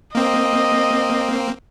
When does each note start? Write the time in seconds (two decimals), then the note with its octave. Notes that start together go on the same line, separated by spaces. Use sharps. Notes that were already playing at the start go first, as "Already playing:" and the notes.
0.15 A#3 C4 D#5